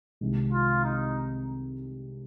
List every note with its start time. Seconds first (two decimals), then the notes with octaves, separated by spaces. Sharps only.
0.21 C2 C3 D#3 G#3
0.52 F4
0.84 D#4